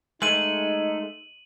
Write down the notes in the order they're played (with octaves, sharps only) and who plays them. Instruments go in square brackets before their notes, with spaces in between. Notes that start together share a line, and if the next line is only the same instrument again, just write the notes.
[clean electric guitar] G#3 A3 [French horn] D#4 [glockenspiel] D#7 F#7